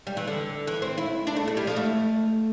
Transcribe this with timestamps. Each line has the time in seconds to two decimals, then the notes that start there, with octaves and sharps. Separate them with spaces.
0.07 G3
0.17 E3
0.28 D3
0.67 E3
0.82 C4
0.98 E4
1.27 D4
1.37 A3
1.48 A3
1.57 G3
1.67 F3
1.76 A3